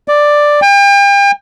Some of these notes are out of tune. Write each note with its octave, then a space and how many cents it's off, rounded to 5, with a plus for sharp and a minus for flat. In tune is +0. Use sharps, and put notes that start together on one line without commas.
D5 +5
G5 +40